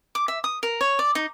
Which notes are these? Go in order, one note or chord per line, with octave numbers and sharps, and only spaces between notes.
D6
E5
D#6
A#4
C#5
D5
D#4